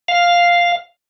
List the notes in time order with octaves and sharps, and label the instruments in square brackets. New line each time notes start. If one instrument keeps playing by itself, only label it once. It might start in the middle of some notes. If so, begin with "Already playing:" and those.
[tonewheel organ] F5